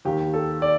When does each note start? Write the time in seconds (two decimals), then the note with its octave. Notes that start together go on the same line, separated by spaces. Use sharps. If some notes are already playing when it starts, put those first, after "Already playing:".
0.05 D#2 D#3 G4
0.34 A4
0.62 D5